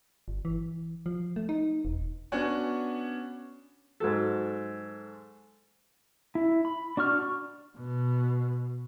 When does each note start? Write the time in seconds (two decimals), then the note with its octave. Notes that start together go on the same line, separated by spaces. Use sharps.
0.28 G1
0.45 E3
1.06 F3
1.36 A3
1.49 D#4
1.85 E1
2.32 B3 C#4 D4 F#4 C#5 G#5
4.00 G#2 F#3 A4
6.35 E4
6.65 B5
6.97 D4 F#4 C#6 F6
7.78 B2